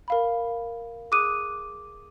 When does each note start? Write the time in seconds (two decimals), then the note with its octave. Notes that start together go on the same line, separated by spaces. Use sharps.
0.08 A#4 F5 B5
1.11 G#4 D6 D#6 F#6 D#7